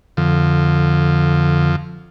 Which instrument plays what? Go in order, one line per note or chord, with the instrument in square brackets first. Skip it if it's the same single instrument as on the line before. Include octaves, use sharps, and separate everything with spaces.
[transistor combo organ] F2 [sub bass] D3